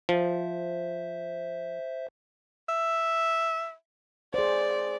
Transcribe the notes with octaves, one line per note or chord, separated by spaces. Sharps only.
F3 C5 E5
E5
G#4 C5 D5